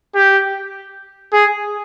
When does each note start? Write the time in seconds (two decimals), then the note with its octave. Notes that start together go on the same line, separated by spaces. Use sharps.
0.15 G4
1.33 G#4